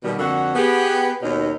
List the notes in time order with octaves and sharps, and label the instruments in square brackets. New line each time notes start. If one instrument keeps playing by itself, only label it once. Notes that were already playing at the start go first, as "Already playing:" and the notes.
[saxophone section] B2 D#3 G3
F2 D3 A#3 F#4 A4 F#5
B3 G4 G#4
D#2 B2 C#4 D#4